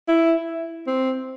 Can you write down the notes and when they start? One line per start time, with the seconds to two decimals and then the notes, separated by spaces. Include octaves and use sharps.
0.08 E4
0.87 C4